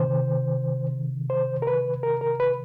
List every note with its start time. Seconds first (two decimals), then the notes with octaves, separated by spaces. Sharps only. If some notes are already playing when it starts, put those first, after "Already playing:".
Already playing: C3 D#3 C5
1.30 C5
1.62 A#4
1.67 B4
2.03 A#4
2.21 A#4
2.40 B4